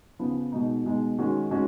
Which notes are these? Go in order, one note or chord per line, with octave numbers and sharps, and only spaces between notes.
C#3 F3 B3
B2 G#3 D#4
B2 G#3 D#4
D#3 G#3 C#4 F#4
D#3 G#3 C#4 F#4